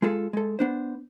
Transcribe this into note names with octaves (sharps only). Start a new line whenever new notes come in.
G#3 F4 G#4 A4
G#3 A4
B3 D4 C5